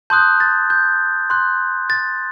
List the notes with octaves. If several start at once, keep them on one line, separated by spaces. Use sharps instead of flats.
A5 C6 D#6 F#6 G6
A6
G6
C6 F#6
A6